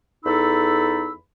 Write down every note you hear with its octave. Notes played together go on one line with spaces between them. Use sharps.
E2 D#4 A4 B5 E6